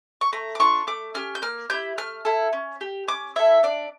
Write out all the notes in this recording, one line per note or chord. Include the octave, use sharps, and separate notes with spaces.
C#6
A3 A#5
D6
D4 F4 C#6
A3 D6
C#4 G4 F6
G6
A#3 F6
E4 G4 G6
A3 F6
E4 A4
C#4
G4
C#4 D6
E4 A4 E5
D4 D5